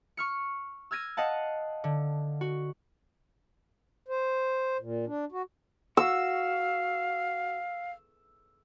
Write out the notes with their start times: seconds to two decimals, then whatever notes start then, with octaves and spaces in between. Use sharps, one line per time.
0.17 C#6 F6 C#7
0.91 E6 F6 G#6 A#6 D#7
1.17 D#5 F5 F#5 A5
1.84 D3
2.41 F#4
4.08 C5
4.79 A#2
5.07 D4
5.32 F#4
5.97 F#4 F5 E6